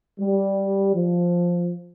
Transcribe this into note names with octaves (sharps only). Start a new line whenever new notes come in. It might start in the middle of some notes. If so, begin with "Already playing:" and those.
G3
F3